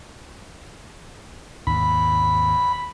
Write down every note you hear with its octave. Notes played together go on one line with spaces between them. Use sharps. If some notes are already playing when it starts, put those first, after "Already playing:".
D#2 G#2 C3 B5